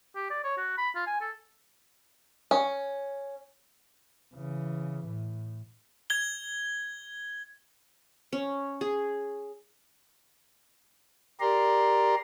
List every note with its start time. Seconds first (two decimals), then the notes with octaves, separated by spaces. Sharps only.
0.16 G4
0.31 D5
0.44 C#5
0.58 F#4
0.78 B5
0.95 F4
1.07 G#5
1.21 A4
2.51 C#4
4.35 C#3 E3
5.04 A2
6.10 G#6 G7
8.33 C#4
8.81 G#4
11.40 G4 A#4 D5 A#5 C6